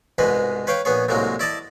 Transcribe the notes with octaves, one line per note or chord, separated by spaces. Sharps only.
C2 G#2 B2 G#3 B4
B4 C#5 F5 G5
A#1 B3 G#4 C#5
C2 A2 C3 F#3 G#3 A#3
E4 D5 D#5 A5